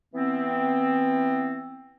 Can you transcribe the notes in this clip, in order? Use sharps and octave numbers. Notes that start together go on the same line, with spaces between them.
E3 B3 C4